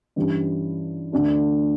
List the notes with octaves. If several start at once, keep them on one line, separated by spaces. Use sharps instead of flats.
G2 E3 G3 C#4
D2 D3 A3 D4